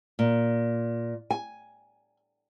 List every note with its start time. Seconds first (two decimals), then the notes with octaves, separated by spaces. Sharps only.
0.19 A#2
1.30 G#5